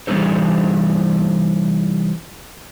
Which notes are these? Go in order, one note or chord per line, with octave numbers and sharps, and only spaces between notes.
C3 E3 G3 D#4 A4 C5